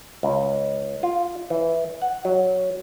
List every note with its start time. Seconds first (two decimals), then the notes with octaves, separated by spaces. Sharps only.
0.23 C#2
1.03 F4
1.50 E3
2.02 F#5
2.25 F#3